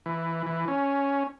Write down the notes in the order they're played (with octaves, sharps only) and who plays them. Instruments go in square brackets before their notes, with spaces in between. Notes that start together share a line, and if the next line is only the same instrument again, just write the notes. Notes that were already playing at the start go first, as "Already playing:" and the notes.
[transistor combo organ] E3
E3
C#4